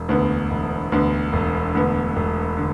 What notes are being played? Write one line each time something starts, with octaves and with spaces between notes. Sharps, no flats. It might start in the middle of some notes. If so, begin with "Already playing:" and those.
Already playing: E1
D2 D3 B3
E1
D2 D3 B3
E1
D2 D3 B3
E1
D3